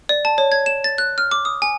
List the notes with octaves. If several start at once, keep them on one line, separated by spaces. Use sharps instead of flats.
D5
A5
C#5
G#6
E7
A6
F#6
F6
D6
D#6
G#5